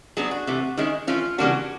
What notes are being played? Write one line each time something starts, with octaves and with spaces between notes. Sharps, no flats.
F#3 B3 D4 G#4
F#4
C3 E3 A3
D#3 G#3 C#4 E4
E3 A3 C#4 F4
C#3 E3 G3 A#3 D4 F#4